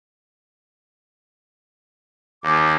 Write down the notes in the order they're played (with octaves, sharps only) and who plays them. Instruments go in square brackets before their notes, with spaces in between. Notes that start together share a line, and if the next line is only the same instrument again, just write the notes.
[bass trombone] D#2 [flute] D6